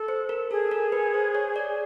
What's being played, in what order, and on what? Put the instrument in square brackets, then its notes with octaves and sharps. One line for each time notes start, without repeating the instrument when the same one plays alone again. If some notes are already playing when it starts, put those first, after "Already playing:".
Already playing: [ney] A4
[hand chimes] C5
A#4
[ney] G#4 [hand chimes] A4
[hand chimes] A#4
B4
C5
C#5
D5